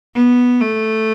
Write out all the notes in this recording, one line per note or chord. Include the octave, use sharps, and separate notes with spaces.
B3
A3